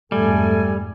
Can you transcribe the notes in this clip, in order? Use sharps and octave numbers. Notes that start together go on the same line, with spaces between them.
F2 G#2 G3 A3 A4 G#5